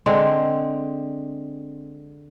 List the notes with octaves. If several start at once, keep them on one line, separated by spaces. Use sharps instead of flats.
D3 G#3 C4